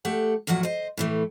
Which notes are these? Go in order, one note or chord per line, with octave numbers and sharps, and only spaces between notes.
A3 G4 F#5
E2 A2 F3 F#3 F#5
C5 D#5
A2 E3 A3